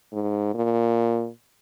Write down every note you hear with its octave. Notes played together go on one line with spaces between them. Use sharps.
G#2
A#2